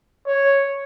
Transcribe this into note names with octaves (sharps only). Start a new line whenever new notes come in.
C#5